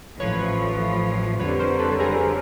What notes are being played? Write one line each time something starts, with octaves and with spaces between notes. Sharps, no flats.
A1 A2 F3 B4 C#5
F2 D3 G3 B4 C#5
A#4 C5
A4 B4
G#4 A#4